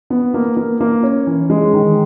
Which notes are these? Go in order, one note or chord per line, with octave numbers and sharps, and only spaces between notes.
B3
A#3
A#3
A#3
C#4
E3
G#3
D#3